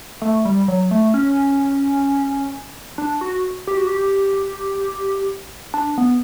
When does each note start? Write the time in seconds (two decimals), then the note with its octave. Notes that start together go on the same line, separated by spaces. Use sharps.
0.22 A3
0.45 G3
0.68 F#3
0.91 A3
1.14 C#4
2.98 D4
3.21 F#4
3.67 G4
3.77 F#4
3.87 G4
5.74 D4
5.98 B3